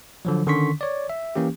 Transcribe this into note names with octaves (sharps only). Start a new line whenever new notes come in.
D3 F3 F#3
D3 D#3 C#4 C6 C#6 B6
C#5 D5
E5
E3 A#3 C#4 G4